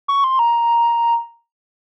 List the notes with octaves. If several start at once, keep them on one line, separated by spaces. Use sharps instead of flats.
C#6
C6
A#5